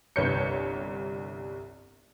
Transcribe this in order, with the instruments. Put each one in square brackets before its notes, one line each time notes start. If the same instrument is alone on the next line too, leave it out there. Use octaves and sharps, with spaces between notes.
[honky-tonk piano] G1 C2 B4 C#5 G6 C#7